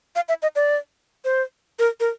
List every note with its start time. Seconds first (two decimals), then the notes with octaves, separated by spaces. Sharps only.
0.16 F5
0.29 E5
0.42 D#5
0.56 D5
1.25 C5
1.79 A#4
2.00 A#4